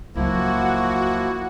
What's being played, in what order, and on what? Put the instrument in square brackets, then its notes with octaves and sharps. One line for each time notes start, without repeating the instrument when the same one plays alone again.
[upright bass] C#2 F#3 [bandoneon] F3 A#3 E4 [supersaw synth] F#4